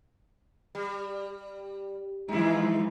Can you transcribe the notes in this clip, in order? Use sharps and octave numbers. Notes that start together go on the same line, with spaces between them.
G3
E3 F3 G#3 D#4 E4